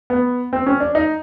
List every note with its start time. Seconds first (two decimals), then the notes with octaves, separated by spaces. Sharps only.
0.10 B3
0.53 C4
0.66 C#4
0.80 D4
0.95 D#4